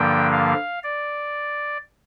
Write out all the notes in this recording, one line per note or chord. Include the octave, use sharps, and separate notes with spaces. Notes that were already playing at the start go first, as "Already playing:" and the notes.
Already playing: G2 D3 F3 A#3 G5
F5
D5